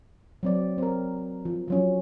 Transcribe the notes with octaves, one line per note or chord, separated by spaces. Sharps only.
F#3 C4 D5
C4 A#4
F3
F3 F#3 C#4